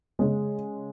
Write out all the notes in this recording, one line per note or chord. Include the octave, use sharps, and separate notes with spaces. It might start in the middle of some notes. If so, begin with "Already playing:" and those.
C#3 G#3 C#4 G#4